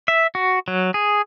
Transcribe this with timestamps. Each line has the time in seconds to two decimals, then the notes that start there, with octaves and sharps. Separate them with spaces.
0.08 E5
0.35 F#4
0.68 F#3
0.94 G#4